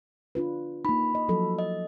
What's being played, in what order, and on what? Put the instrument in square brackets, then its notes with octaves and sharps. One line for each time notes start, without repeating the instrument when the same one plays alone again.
[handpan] D4 F4 B4
[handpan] A#3 D#4 [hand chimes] B5
[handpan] D#5
F3 F#3 A4
[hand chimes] D#5